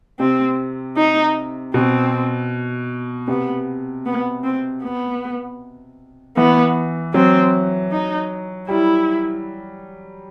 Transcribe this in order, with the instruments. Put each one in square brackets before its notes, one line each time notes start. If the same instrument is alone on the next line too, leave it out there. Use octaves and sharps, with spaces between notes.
[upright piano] C3 [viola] C4
[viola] D#4
[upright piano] B2 [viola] C4
[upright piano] C3 [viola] B3
[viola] B3
C4
B3
[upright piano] E3 [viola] B3
[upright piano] F#3 [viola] C4
[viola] D#4
[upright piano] G3 [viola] E4